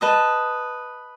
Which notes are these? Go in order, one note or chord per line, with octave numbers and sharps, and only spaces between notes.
B4 D#5 A5 D#6